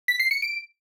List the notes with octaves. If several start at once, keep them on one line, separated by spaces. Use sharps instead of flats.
B6
C7
C#7
D7